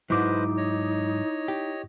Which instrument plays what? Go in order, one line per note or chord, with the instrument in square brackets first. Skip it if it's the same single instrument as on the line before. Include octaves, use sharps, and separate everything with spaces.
[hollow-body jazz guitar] G#2 F#3 [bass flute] D#4 [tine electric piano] E4 D6 [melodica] B4 C5 D#5
[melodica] C#5 D#5
[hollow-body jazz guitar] G4